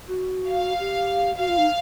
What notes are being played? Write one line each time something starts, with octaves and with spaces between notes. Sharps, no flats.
F#4
F5
G4
F#4 F5
F4
D#4